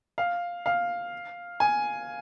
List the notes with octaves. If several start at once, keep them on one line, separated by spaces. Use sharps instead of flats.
F5
F5
G#5